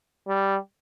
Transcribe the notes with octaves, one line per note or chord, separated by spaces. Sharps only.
G3